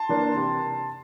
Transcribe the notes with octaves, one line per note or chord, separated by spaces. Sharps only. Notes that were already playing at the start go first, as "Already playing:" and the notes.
Already playing: A5 C6
E3 A#3 D4
C3